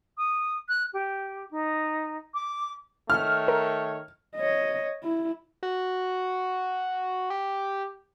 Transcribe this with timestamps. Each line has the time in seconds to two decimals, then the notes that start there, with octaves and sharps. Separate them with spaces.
0.17 D#6
0.68 F#6
0.93 G4
1.50 D#4
2.34 D6
3.10 D#3 A3 C#5 F6
3.48 A#4
4.36 C#5 D#5
5.03 E4
5.63 F#4
7.30 G4